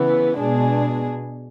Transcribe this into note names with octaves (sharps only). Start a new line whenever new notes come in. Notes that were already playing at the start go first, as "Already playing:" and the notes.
Already playing: C#3 E3 B3
B2 G#3 D4 G#4